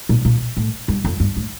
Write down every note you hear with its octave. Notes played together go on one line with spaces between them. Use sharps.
A#2
A#2
A2
G2
F2
G2
A2